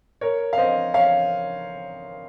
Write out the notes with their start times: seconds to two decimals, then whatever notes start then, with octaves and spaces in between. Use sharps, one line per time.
0.21 A#4 C#5
0.53 F5
0.58 C5 D#5
0.94 C#5 F5